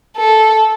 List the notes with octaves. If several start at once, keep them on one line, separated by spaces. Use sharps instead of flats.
A4